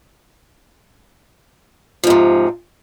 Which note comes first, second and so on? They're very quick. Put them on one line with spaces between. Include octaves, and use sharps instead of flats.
F3 G#2 C3